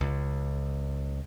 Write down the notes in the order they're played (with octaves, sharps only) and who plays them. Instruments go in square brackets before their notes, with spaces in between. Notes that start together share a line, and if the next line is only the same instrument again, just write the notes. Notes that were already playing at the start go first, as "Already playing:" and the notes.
[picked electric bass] C#2